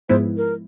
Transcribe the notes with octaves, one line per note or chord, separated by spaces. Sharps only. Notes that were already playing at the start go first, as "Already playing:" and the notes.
G#2 F3 G#3 B3 E4 C5
A#4